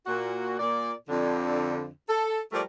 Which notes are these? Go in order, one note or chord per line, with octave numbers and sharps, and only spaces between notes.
A#2 F#4
A#2 D5
F2 D3
A4
F3 G3 A3 A#4 D5